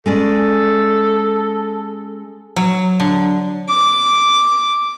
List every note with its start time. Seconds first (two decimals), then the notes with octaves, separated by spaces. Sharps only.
0.06 G#3 C#4 A4 D5
2.56 F#3
3.00 D3
3.69 D6